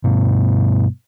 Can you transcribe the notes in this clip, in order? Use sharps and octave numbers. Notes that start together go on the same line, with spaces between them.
G2 B2